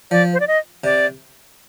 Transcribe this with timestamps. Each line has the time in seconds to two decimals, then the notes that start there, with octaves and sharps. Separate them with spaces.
0.11 F3 D5
0.33 C5
0.40 D5
0.48 D#5
0.84 C3 D5